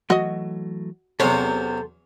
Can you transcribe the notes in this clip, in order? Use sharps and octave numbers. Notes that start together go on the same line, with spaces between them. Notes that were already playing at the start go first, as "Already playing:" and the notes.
E3 F#3 A3 F#4 D#5
E2 C3 F#3 C#4 A4 C5